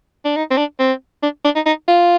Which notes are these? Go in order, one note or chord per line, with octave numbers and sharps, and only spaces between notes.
D4
D#4
C4
D4
C4
D4
D4
D#4
D#4
F4